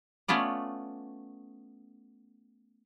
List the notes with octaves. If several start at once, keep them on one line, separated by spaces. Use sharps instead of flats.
A3 B3 C#4 F4 D5